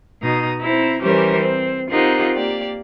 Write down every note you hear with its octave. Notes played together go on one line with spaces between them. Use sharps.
B2 D#4 A#5 D#6
C4 E4 A#5
E3 G3 C#4 G4 A#4 C5
C4
C4 D#4 F4 G4 A#4 F#5
A#3 G4 D5